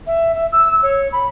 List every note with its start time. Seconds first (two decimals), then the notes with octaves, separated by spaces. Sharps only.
0.06 E5
0.34 E5
0.52 E6
0.82 C#5
1.12 B5